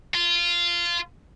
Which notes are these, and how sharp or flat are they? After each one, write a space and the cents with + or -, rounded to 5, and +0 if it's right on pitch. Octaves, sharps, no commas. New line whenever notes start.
F4 -15